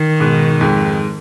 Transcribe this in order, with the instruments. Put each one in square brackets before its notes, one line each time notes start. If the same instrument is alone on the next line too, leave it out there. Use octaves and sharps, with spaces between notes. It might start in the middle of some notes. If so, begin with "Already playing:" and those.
Already playing: [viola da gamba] D#3
[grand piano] G#2 B2
F2 G#2